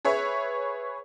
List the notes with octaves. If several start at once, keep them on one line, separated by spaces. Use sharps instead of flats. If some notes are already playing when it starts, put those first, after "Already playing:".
G#4 B4 C#5 E5